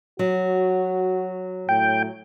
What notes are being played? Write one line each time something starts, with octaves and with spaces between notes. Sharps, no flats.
F#3 F#4
A2 G5